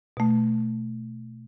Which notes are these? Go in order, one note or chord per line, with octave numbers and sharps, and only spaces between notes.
B2 A3